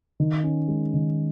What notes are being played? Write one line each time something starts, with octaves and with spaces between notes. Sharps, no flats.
D#3
C#4
G#3
D#3